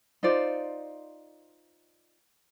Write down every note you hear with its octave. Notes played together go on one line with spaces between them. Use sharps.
D#4 F4 C5 D5